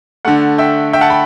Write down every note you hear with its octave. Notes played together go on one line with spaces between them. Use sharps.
D3 A3 F#5
E5 G5
E5 G5
F#5 A5
G5 B5